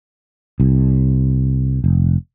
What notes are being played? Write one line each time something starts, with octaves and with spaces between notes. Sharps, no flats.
C2
F1